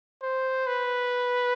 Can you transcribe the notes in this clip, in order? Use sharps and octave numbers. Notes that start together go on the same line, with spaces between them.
C5
B4